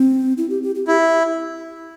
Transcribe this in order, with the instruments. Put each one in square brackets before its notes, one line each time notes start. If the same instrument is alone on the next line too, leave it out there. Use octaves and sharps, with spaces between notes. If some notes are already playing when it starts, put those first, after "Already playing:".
Already playing: [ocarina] C4
E4
G4
G4
G4
[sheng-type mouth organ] E4 [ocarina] G4